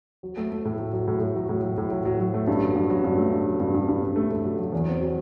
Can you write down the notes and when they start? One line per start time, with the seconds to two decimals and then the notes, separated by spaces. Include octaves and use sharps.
0.23 F#3
0.37 A3
0.52 A3
0.65 A2
0.80 F#3
0.93 F#3
1.08 A2
1.21 A2
1.36 F#3
1.49 A2
1.64 F#3
1.78 A2
1.92 F#3
2.05 F#3
2.20 F#3
2.34 A3
2.47 G2
2.62 F#3
2.76 G2
2.90 F#3
3.04 G2
3.18 A3
3.32 G2
3.46 F#3
3.60 G2
3.74 G2
3.88 G2
4.03 G2
4.16 A3
4.31 A3
4.45 F#3
4.59 F#3
4.72 E2
4.87 C4
5.01 F#3